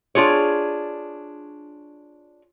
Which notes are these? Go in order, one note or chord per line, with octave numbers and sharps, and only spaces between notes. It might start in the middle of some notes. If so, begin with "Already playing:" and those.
D4 F4 G#4 C#5